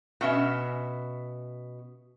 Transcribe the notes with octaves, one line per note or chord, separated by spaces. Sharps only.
B2 C#4 E5